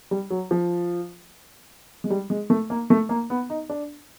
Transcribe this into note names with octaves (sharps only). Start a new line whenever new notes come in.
G3
F#3
F3
G#3
G3
G#3
A3
A#3
A3
A#3
B3
D#4
D4